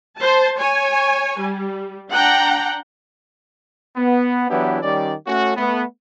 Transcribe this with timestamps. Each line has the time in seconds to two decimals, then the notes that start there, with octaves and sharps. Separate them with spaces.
0.17 C5 A5
0.59 C#5 G#5
1.39 G3
2.09 D4 F#5 G5 A#5
3.96 B3
4.49 E3 F#3 B3 D4 E4 G4
4.82 D#3 G3 C#4 D5
5.27 A3 C#4 F#4
5.57 A3 B3